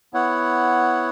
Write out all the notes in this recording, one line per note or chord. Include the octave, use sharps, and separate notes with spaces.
B3 E4 C#5 F#5